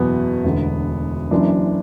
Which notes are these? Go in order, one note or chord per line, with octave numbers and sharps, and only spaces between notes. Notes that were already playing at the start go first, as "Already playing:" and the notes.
Already playing: F#1 E2 B2 B3
E1 D2 D3
F#1 F#2 E3 D4